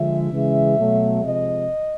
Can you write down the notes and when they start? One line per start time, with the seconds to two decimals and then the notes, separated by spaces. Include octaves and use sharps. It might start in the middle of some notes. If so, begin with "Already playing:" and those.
Already playing: D3 F3 G#3 E5
0.32 C#3 E3 G#3
0.78 B2 F#3 A3
1.23 C3 F3 G#3 D#5